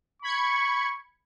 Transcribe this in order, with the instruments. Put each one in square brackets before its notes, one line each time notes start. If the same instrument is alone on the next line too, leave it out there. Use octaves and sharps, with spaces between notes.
[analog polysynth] B5 G#6 C#7 [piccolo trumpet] C#6